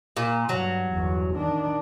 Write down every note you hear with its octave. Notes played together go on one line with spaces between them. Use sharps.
A#2
G2 F#3
G1 E2
D#3 D4